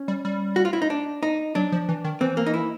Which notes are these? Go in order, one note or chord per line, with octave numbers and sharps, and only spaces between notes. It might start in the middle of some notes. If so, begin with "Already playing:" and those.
Already playing: C#4
G3
G3
F#4
F4
E4
D#4
D4
D#4
F#3 D4
F3
E3
D#3
E3 C4
A#3
D#4
E4